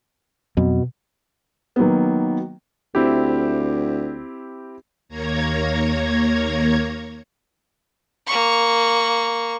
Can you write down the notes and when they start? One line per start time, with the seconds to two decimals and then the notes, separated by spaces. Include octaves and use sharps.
0.57 F2 B2 F#3 C4
1.76 D#3 F#3 A#3 B3
2.95 D2 C4 E4 G4
5.09 D#2 A#3 C#5 A#5 G#6
8.27 A#3 C#6